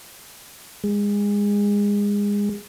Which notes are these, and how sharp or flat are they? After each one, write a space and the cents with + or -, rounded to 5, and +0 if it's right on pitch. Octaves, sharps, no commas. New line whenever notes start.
G#3 -25